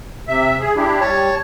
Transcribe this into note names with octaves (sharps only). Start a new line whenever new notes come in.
C3 E5
G#4
D4 E4 G4
G3 C#5 A5